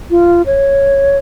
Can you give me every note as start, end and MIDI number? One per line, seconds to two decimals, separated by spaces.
0.11 0.42 65
0.46 1.18 73